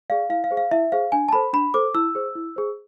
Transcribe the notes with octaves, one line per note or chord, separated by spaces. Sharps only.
G#4 D5 F5
E4 F5
F5
G#4 C5
F5
E4 E5
G#4 C5 F5
D4 G#5
A5
A4 C5 B5
D4 B5
A4 C5 D6
E4 E6
G#4 C5
E4
G#4 C5